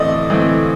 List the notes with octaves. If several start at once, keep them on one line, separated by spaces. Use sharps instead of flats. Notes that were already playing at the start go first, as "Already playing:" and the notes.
Already playing: A2 E3 A3 C4 D5 D#5
A2 E3 A3 C4